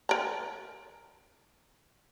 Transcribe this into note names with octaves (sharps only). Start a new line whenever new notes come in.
A#4 A#5